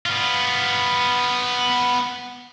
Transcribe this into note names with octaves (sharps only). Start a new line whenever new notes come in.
B3 F4